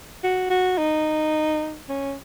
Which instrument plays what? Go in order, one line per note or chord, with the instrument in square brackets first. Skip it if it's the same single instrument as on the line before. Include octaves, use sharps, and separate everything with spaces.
[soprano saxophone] F#4
F#4
D#4
C#4